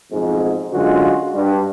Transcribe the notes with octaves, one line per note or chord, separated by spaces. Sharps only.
B1 F2 G#2
F#2 D3 G#3 F4 F#4
G2